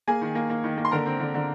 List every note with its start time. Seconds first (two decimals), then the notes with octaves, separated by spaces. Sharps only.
0.08 A#3 G#4 G#5
0.22 D#3
0.35 A#3
0.50 A#3
0.64 D#3
0.77 A#3
0.85 C6
0.91 D3 A#4 A#5
1.06 C4
1.20 D3
1.34 D3